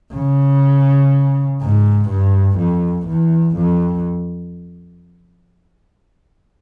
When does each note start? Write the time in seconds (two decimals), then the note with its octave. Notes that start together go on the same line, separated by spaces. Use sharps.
0.14 C#3
1.62 G#2
2.09 G2
2.58 F2
3.08 E2
3.56 F2